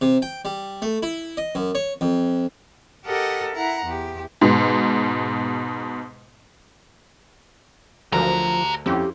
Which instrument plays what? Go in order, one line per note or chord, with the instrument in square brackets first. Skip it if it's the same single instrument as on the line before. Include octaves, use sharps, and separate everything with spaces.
[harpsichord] C3
G5
G3
A3
E4
D#5
F#2
C#5
F2
[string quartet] G4 A4 A#4 D#5 F#5
E4 F#5 A#5
E2 G4
[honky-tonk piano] G#2 B2
[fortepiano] D2 F#3 A#4 [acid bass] F3 [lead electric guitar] G4 A#5
[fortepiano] F2 C#4 E4 [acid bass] G4